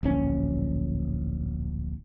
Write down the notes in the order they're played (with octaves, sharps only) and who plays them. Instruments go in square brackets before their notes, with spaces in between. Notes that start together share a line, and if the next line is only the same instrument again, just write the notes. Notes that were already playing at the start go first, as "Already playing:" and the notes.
[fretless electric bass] D1 A#1 C#4